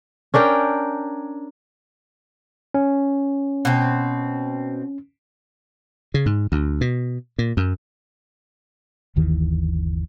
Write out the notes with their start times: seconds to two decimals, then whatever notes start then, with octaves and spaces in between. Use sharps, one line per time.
0.34 C#4 D4 A#4 G5
2.74 C#4
3.65 B2 C4
6.14 C#3
6.26 G#2
6.52 D2
6.81 B2
7.39 A#2
7.57 F#2
9.16 G1 D#2 D#3 E3